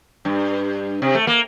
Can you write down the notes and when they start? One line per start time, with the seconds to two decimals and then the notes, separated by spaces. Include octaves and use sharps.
0.25 G2
1.02 C3
1.15 A3
1.27 A#3